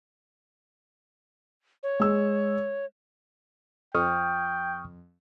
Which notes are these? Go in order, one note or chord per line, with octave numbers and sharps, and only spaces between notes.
C#5
G#3 E6
F2 G5 C#6 D#6 F6